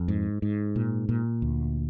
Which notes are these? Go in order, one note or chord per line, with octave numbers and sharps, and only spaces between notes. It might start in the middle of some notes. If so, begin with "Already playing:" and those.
Already playing: F2
G#2
G#2
A#2
A#2
D2